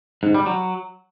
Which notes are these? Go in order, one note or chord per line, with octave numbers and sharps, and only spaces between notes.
G#2
G3
F#3